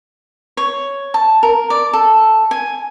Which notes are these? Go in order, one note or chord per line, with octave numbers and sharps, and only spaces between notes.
C#5
A5
A#4
D5
A4
G#5